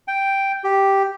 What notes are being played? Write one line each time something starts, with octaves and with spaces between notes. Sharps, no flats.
G5
G4